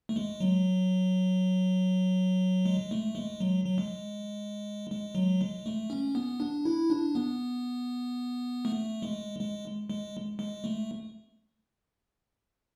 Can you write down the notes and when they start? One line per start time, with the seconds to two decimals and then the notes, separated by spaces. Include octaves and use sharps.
0.09 A3
0.16 G#3
0.40 F#3
2.66 G#3
2.91 A3
3.15 G#3
3.40 F#3
3.66 F#3
3.78 G#3
4.91 G#3
5.15 F#3
5.41 G#3
5.66 A3
5.90 C#4
6.15 B3
6.40 D4
6.65 E4
6.90 D4
7.15 B3
8.65 A3
9.02 G#3
9.40 G#3
9.90 G#3
10.39 G#3
10.64 A3